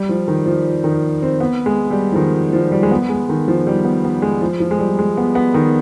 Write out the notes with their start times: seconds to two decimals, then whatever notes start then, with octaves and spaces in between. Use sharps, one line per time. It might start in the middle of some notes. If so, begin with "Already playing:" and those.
Already playing: G3
0.09 F3
0.28 D#3
0.46 F3
0.84 D#3
1.22 C4
1.40 B3
1.66 G#3
1.91 G3
2.12 F3
2.16 D#3
2.53 F3
2.72 G3
2.83 G#3
2.91 B3
3.09 G#3
3.29 D#3
3.48 F3
3.67 G3
3.84 B3
4.04 B3
4.22 G#3
4.41 F3
4.60 F3
4.71 G#3
4.79 G3
4.99 G#3
5.17 B3
5.35 B3
5.54 D#3